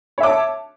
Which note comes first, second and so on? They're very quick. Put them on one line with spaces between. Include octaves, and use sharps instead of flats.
C#5 E5 D6 A5